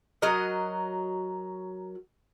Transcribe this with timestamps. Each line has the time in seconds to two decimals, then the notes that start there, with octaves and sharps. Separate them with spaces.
0.22 F#3 F#4 A#4 D#5